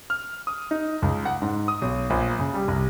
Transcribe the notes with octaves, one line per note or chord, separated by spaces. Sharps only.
F6
D#6
D#4
C#2
F#5
G#2
D#6
B1
A#1
C#3
G3
C2